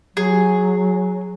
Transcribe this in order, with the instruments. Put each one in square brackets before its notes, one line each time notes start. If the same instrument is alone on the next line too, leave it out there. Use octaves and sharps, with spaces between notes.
[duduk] F#3 [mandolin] G#4